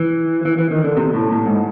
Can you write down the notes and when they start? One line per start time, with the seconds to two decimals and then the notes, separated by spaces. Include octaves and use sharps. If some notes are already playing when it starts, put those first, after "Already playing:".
Already playing: E3
0.45 E3
0.58 E3
0.71 D#3
0.84 D3
0.97 C3
1.14 A2
1.32 A2
1.46 G#2